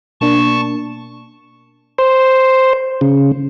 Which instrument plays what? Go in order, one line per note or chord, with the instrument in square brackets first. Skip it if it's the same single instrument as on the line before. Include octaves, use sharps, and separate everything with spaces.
[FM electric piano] B2 A#3 D4 [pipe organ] A5 C#6
[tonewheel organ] C5
C#3